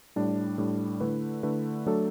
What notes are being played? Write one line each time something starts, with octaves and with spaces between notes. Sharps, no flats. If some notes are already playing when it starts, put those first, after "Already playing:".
A2 G3 D4
A2 G3 D4
D3 A3 E4 B4
D3 A3 E4 B4
F#3 A3 D4 A4